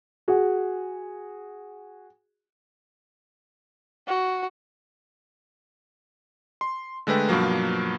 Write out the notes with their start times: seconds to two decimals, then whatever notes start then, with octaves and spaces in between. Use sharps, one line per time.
0.28 F#4 G#4
4.07 F#4
6.61 C6
7.07 D3 G#3 A3 B4 G5
7.28 G2 B2 F3 F#3 A#3